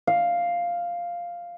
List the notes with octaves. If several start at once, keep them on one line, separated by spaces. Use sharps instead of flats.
F5